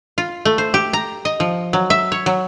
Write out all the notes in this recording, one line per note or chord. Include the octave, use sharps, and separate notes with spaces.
F4
A3
C5
G4
A#5
D#5
F3
F#3
E5
C#5
F#3